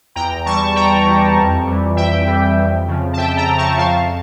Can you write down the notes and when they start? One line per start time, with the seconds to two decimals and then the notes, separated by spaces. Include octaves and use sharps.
0.15 E2 G5 A#5
0.45 E3 G3 A5 C#6
0.75 E2 G5 A#5
1.06 E3 G3
1.36 F2
1.66 E3 G3
1.96 F2 E5 G5
2.27 E3 G3
2.57 F2
2.87 C#3 F3
3.13 A5
3.17 F2 E5 G5
3.37 G5 A#5
3.48 C#3 F3
3.58 A5 C#6
3.77 F2 F5 A5